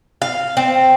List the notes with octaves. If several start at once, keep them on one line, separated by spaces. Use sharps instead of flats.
F5
C4